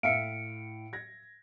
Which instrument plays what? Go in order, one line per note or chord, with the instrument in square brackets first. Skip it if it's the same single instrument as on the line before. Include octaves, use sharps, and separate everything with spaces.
[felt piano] A2 [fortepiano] E5 F5 [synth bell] C#7 D7
[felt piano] G#6 A#6